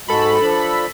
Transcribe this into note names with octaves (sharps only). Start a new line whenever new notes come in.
G#2 G#3 F#4 A4 B5
F3 D4